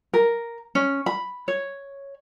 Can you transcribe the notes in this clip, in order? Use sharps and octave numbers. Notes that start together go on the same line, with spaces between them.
A#4
C#4
B5
C#5